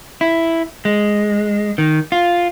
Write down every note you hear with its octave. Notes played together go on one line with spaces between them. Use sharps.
E4
G#3
D#3
F4